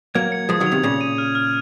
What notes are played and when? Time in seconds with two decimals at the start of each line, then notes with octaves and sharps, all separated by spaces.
0.15 F#3 A#3 G#6
0.32 C#7
0.49 F3 G#3 D#6
0.60 D#3 F#3
0.66 F7
0.72 C3 D#3
0.83 A#2 C#3 G#6
1.01 D#7
1.18 F6
1.35 F6